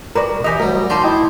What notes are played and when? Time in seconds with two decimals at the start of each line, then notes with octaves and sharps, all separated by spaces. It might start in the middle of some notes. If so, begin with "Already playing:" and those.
0.15 G3 F#4 A#4 B4 D5
0.44 E3 G4 D#5 G#5
0.60 D2 F#3 G3 A#4
0.90 F3 D#4 D5 A5 C6
1.04 E4 D#5 G5